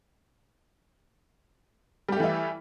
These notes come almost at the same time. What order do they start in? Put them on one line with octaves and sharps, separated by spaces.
G3 G4 A3 E3 E4